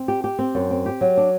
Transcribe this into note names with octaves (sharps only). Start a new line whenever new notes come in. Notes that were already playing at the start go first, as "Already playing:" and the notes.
Already playing: C4
G4
G4
C4
F#2
C4
G4
F#3
D4